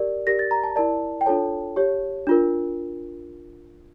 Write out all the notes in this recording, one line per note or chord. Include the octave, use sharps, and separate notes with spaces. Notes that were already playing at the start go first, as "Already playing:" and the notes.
Already playing: G4 A#4 D5
G4 A#4 D5 A#6
A6
A#5
A5
E4 A#4 D5 A5
G5
D4 F4 A4 C#5 A5
G4 C#5
D4 F4 A#4